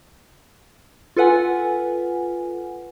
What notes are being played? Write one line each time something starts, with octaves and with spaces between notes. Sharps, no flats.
F4 A4 B4 F#5 G#5